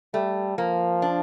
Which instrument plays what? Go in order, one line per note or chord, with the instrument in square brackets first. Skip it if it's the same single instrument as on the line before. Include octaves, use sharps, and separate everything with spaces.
[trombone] G3 [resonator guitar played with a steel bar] A3
[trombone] F3 [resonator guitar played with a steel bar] A#3
[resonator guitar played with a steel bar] D4